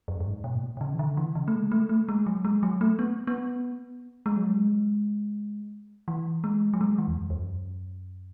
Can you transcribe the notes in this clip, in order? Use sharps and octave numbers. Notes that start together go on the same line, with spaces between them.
F#2
F#2
G#2
B2
A2
B2
B2
C#3
E3
D3
E3
C#3
A3
G#3
A3
A3
G#3
F#3
G#3
F#3
A3
B3
B3
G#3
F#3
G#3
E3
G#3
F#3
G#3
E3
E2
F#2
E2
F#2